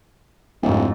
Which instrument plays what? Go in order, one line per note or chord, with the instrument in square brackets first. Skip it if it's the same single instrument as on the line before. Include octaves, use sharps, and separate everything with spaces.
[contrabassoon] D1 [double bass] F2 G#2